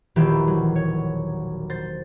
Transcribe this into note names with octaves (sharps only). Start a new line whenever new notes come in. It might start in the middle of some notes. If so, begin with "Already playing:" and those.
E1 A#1 D#3 E3 G4 E5
F#3
C#5
C5 A6